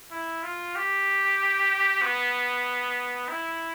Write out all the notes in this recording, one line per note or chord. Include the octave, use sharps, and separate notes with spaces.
E4
F4
G4
B3
E4